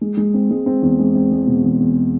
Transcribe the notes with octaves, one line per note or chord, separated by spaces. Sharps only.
G#3
G#3
C4
G#3
C4
E2
G#3
C4
G#3
B2
E2
E2